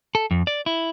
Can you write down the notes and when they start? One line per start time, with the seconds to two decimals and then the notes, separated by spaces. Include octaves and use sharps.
0.15 A4
0.31 F2
0.47 D5
0.66 E4